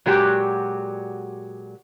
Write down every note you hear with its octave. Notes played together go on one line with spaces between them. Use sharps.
A#2 F#3 G#3 F#4 G4